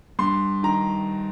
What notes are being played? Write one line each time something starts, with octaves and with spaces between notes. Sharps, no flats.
G2 C6
D#3 A#5